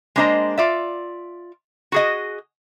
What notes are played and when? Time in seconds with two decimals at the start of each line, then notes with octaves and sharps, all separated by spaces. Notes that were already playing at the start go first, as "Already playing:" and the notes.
0.16 G#3 A#3 D4 C5 D#5 A#5
0.58 F4 D5 E5
1.92 F#4 G#4 D#5